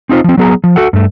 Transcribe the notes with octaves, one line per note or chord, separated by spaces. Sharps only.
C4 D#4 F4 C5
F3 C4
F#3 B3 G#4 A#5
F3
F#4 A4 F#5
G2 A3